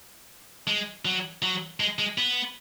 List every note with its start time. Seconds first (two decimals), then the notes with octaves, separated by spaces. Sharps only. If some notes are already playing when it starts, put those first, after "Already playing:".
0.67 G#3
1.05 F#3
1.43 F#3
1.80 G#3
1.99 G#3
2.18 B3